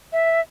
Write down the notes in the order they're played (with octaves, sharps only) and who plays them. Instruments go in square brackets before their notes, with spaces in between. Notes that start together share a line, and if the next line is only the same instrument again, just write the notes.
[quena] E5